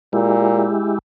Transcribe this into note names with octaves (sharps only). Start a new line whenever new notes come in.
A#2 G#3 E4 G4